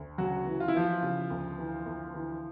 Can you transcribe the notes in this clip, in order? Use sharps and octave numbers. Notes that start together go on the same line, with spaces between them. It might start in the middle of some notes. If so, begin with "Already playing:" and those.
Already playing: D2
C#3 F#3 F#4
E3
F4
E4
E3 F3 F4
C#3
D2
E3
D2
E3